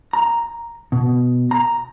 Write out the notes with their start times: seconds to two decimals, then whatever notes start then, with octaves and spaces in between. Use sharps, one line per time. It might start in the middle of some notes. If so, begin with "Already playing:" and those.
0.13 A#5
0.92 B2
1.51 A#5